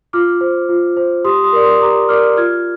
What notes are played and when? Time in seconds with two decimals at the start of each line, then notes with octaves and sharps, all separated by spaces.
0.13 F4 D6 F6
0.41 C5
0.69 F4
0.97 C5
1.25 G4 C6 D#6
1.44 C6 D#6
1.53 A#4 D5
1.62 C6 D#6
1.81 G4 A#5 D6
2.09 A#4 D5 D6 F6
2.37 F4 F6 G#6